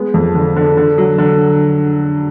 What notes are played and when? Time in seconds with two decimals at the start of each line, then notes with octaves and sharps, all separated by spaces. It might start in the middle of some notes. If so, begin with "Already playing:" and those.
Already playing: G#3 B3
0.14 F2
0.35 D3
0.56 D3
0.77 D3
0.98 F#3
1.18 D3